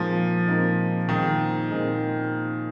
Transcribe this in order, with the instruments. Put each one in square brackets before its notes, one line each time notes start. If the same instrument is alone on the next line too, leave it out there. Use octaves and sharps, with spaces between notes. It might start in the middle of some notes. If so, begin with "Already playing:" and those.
Already playing: [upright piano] A#2 G#3 C4 D#4 A#4 [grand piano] F3
[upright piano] A#2 G#3 C4 D#4 A#4
[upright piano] A#2 G#3 C4 D#4 A#4 [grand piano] D#3
[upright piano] A#2 G#3 C4 D#4 A#4